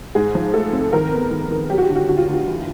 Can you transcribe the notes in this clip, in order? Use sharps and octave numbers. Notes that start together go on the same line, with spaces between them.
G#2 G#4
F3
A3 A4
C4
D#3 A#4
B3
D#3
D#3
F#3 G4
F#4
G4
D3
F#4
D3 F#4
F4
D2
F4
E3